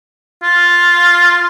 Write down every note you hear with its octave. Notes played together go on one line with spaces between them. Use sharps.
F4